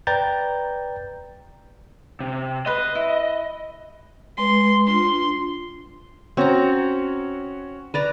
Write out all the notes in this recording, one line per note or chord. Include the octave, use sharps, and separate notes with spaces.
B4 D5 G5 A#5 G6 A6
C3
B4 D#5 C6
E4
G#3 B4 C6
D4 F4 C6
C4 C#4 F#4 C#5 A#5
B4 D5 A#5